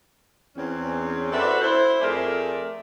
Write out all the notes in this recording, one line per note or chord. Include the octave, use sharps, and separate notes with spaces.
E2 C4 C#4
F#4 A4 B4 C5 D5 E5
E4 C5
F2 A3 G#4 A#4 D5 E5